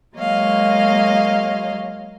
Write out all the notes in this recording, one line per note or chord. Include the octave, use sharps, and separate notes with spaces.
F#3 G#3 A#3 C#5 D#5 F5